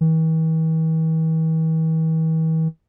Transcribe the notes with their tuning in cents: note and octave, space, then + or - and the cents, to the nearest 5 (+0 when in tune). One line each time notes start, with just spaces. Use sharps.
E3 -45